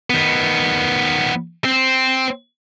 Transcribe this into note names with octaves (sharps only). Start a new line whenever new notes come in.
D#3 B3
C4